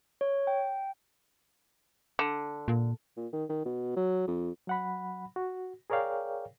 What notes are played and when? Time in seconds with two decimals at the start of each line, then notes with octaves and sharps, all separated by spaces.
0.21 C#5
0.47 G5
2.19 D3
2.68 A#2
3.17 A#2
3.33 D#3
3.49 D#3
3.65 B2
3.96 F#3
4.27 F2
4.67 F#3 F#5 B5
5.36 F#4
5.90 G#4 A#4 C#5 D5 F5 G5